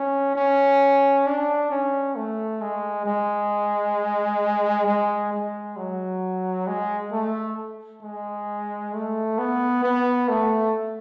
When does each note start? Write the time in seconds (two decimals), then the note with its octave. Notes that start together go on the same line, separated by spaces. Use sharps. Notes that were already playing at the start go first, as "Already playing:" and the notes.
Already playing: C#4
0.36 C#4
1.26 D4
1.71 C#4
2.16 A3
2.61 G#3
3.06 G#3
4.87 G#3
5.32 G#3
5.77 F#3
6.67 G#3
7.12 A3
8.03 G#3
8.94 A3
9.39 B3
9.83 B3
10.29 A3